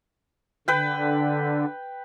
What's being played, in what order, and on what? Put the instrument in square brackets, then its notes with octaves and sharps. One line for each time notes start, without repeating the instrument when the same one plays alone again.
[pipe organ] D3 [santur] B4 G5